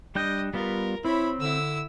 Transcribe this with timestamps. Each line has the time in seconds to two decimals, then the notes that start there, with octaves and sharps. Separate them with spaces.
0.15 G3 D4 D#5 G5
0.54 G3 B3 F4 A#4
1.05 C4 E4 C#5 B5
1.41 D3 E4 E6